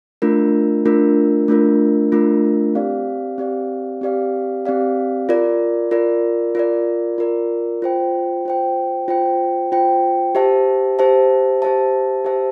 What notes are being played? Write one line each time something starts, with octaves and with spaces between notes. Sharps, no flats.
A3 D4 F4 A#4
A3 D4 F4 A#4
A3 D4 F4 A#4
A3 D4 F4 A#4
C4 G4 D5 F5
C4 G4 D5 F5
C4 G4 D5 F5
C4 G4 D5 F5
F4 A#4 D5
F4 A#4 D5
F4 A#4 D5
F4 A#4 D5
F4 C5 G5
F4 C5 G5
F4 C5 G5
F4 C5 G5
G4 C5 E5 A5
G4 C5 E5 A5
G4 C5 E5 A5
G4 C5 E5 A5